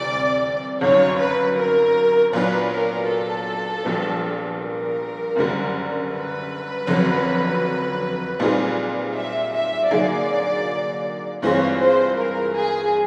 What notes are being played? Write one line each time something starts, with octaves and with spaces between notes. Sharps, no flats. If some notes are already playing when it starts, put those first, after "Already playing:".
Already playing: D2 C3 E3 G3 D5
G1 F#2 D#3 F#3 C#5
B4
A#4
A#2 F#3 B3 D4 B4
A#4
A4
A#1 A#2 G3 B3
A#4
F#1 F#2 D3 G3
B4
F#1 F2 D3 F#3
A#2 G3 C4 D#4 G#4
E5
E5
D3 F#3 A#3 D#4 G#4 D5
G2 E3 G#3 C4 F4 C#5
C5
A#4
G#4